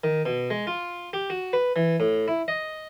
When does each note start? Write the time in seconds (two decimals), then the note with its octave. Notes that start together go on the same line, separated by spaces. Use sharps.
0.04 D#3
0.25 B2
0.50 G#3
0.67 F4
1.13 G4
1.30 F#4
1.53 B4
1.76 E3
2.00 A2
2.28 E4
2.48 D#5